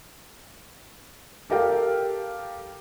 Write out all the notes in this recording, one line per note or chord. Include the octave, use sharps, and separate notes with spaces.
G4 A4 A#4 F5 G5